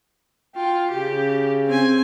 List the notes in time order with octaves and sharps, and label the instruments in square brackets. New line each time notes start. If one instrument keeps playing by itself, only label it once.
[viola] F4 [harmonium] G5
[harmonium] C#3 [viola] G4
[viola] C4 G#5